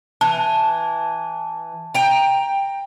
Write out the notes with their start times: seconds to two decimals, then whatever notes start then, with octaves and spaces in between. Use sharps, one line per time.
0.21 E3 A5
1.94 G5 A#5